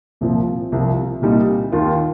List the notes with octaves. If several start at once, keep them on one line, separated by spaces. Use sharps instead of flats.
C2 A#2 F3
C2 C3 F3
C2 A#2 G3 D#4
D#2 D#3 A#3 F4